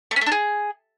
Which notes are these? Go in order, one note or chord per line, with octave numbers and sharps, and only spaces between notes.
A3
C#4
A3
D4
G#4